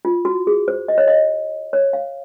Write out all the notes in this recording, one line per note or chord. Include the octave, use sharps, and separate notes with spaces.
F4
F#4
G#4
C5
D#5
C#5
D#5
C#5
F5